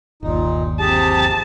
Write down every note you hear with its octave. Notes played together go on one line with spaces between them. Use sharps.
G1 D#2 A#2 D#4
C3 G4 G#4 A5